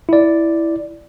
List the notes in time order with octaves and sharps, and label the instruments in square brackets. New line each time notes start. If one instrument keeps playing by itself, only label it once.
[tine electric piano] E4 D5